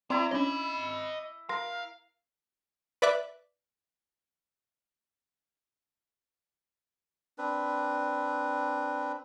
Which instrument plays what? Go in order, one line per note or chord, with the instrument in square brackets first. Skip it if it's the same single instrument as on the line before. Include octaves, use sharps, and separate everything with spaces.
[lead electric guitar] B3 A#5 [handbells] C4 D5 C6 [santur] E4 D6
[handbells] C#4 D4 C#5 [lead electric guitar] D#5 B5
[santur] A#4 [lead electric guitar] F5 [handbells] C6 A#6
[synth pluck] B4 D5 E5 D6 F#6
[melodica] C4 D4 B4